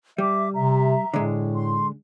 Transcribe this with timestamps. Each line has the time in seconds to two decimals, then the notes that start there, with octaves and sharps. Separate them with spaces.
0.18 G3 E5 D6
0.54 C3 E5 A#5
1.14 A2 D3 G#3
1.54 C6